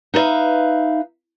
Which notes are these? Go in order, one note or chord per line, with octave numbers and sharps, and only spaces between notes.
D#4 B4 C5 E5 F5